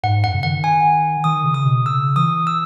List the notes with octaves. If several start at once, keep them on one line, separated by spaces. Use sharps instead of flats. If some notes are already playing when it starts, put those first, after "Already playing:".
G#2 F#5
F#2 F#5
C#3
D#3 F#5
G#5
D#3 D#6
C#3
D#6
B2
C#3 E6
E3 D#6
E6